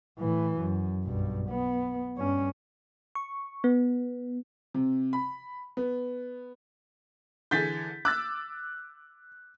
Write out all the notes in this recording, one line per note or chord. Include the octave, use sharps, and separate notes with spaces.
A2 E3
F#2
B1 G2
B3
G2 C#4
C#6
B3
C3
B5
B3
D3 E3 G#4 G6 A6 B6
D6 E6 F#6 A6